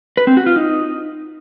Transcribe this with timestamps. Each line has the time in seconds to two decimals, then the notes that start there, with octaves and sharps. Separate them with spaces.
0.17 B4
0.27 C4
0.37 F#4
0.46 F4
0.56 D#4